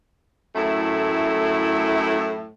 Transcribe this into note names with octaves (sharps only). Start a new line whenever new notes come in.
F#2 A2 A3 E4